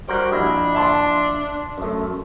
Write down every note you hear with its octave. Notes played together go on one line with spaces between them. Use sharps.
G3 F#4 A#4 C5
A#1 D4 E4 D#5
E5 A5 C6
F#2 A3